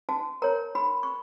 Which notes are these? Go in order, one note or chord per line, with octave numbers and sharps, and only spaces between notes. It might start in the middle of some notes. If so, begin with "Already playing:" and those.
F#4 A5
A#4 C#5 A#5
F#4 B5
C#6